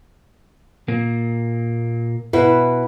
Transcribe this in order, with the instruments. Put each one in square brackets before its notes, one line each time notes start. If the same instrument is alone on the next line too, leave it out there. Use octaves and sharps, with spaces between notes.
[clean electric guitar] A#2 A#3
[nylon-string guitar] B2 E4 B4